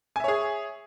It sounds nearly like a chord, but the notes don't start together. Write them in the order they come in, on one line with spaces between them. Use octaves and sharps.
G#5 E5 C#5 G#4